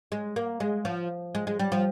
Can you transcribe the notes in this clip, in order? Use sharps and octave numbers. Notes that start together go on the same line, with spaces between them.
G#3
A#3
G#3
F3
G#3
G#3
G3
F3